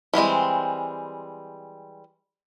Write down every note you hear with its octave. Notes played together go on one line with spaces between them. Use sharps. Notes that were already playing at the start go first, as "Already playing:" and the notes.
E3 G3 G#3 C4